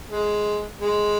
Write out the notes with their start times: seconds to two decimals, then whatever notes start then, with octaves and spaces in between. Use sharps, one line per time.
0.11 G#3
0.81 G#3